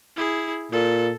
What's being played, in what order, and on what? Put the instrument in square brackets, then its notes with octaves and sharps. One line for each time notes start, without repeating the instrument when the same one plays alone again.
[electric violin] E4 G#4
[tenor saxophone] A#2 [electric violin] A4